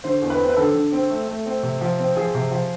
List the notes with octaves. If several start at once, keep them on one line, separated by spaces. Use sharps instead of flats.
D3 C5
E2
B4
C4
B4
D3 A4
D3
C4
A3
A3
C4
C3
F3
C4
F3 G#4
C3
F3